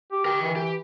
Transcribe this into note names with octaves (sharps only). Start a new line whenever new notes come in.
G4
G4 A#4 G5
E3
G4